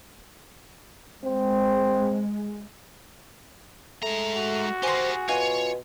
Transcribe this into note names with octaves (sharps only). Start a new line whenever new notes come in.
G#3 C4
G#3 A3 A#5
F#4
G4 G#4 A#4 C5 C6
B2 F4 C#5 G#5